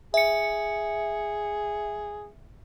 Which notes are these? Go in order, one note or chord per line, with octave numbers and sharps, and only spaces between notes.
G#4 E5 C#7